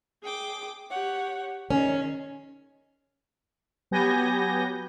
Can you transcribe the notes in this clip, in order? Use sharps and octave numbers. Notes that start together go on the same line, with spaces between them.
G#4 G5 D6
G4 C#5 F#5
D#3 C#4 G#4
F#3 B3 G4 G#5 G6 A#6